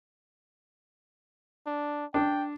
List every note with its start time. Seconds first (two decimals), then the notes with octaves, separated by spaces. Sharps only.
1.67 D4
2.14 D4 G5